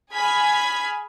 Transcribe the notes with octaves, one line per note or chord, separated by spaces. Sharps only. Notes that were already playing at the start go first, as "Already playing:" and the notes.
G#4 G#5 B5 F6 G#6 B6